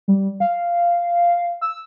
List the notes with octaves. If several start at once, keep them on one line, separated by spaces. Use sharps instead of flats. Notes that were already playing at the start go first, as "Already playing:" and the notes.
G3
F5
E6